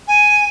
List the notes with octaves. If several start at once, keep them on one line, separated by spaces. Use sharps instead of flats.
G#5